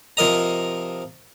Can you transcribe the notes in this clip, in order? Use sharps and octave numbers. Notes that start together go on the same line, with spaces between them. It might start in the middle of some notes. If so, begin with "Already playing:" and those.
C3 F3 A#4 D#5 A#5